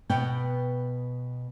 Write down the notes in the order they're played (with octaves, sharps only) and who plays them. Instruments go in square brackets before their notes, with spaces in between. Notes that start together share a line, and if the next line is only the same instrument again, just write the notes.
[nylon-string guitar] B2 B3 F#5 G5